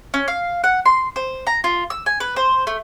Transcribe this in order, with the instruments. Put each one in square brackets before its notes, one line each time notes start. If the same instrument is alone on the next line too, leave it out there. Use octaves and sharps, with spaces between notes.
[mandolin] C#4
F5
F#5
C6
C5
A#5
F4
E6
G#5
B4
C5
A3